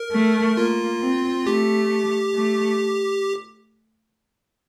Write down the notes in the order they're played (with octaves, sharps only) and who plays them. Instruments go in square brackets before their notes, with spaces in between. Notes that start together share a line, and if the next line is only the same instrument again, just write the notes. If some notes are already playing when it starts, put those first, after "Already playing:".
Already playing: [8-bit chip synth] A#4
[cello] A3
[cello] A#3 [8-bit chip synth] F4
[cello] C4
[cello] A3 [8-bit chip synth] G4
[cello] A3